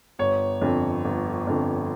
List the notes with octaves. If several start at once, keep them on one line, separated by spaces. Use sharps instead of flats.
G1 C#5
F2 D3
G1
F2 D3